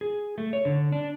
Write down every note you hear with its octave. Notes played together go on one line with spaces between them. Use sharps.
G#4
A3
C#5
D3
D4